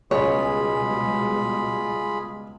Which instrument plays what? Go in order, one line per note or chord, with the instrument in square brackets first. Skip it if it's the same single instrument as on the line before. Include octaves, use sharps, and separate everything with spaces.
[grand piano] C#2 [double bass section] B2 G3 G#3 [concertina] F4 G#4 B5 [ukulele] C#5